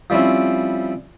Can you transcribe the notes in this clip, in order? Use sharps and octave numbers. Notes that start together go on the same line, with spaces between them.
F3 G3 C4 C#4 E4